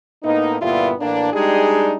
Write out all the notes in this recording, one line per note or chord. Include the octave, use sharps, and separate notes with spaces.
A2 A#3 B3 D#4
G2 A#2 D3 B3 E4 F4
A2 E3 A#3 D4
G3 G#3 D4 D#4 G4 G#4